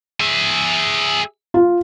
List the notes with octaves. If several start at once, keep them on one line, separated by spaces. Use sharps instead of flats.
G#4 E5
F4